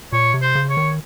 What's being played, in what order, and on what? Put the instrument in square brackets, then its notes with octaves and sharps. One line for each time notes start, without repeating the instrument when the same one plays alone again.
[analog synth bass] A#2 [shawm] C#5
[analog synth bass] C3
[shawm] C5
[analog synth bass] C#3
[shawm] C#5
[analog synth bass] D#3